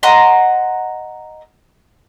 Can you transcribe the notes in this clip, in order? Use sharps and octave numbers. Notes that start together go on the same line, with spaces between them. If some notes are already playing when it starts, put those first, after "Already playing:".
D#5 F#5 A#5 C6